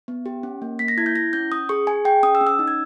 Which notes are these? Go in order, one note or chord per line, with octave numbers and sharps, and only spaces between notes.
B3
G4
C#4
A#3
A#3 B6
A#6
E4 G#6
G6
E4 A#6
C#4 G6
C#4 D#6
G#4 C#6
G#4 G#5
G#4 G5
C#4 D#6
E6
C#4
E6
D#4
G#6